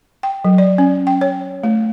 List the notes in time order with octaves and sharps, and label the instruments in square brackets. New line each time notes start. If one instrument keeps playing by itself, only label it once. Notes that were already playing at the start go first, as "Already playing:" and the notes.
[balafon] G5
F#3
D5
C#4
G5
C#5
A3